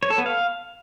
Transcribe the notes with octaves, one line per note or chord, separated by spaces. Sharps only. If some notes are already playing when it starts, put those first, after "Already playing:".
C#5
A4
B3
F5